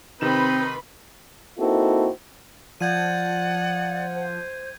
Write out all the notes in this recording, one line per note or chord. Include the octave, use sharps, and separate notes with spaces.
C3 D#3 C4 D#4 B4 B5 C6 E7
A#3 C4 D#4 E4 F#4 A4
F3 D5 F#5 G6 G#6 D#7
C5